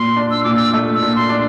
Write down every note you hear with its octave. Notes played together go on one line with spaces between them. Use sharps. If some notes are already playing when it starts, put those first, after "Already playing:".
Already playing: A#2 C6
D4
E6
A#2 D6
E6
A3
E6
A#2
C6
D4